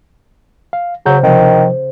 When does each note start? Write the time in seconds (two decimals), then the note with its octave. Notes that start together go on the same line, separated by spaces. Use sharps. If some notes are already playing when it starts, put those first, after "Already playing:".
0.73 F5
1.06 C#3 F#3 G#4 C5 G6
1.23 C3 D#3 F3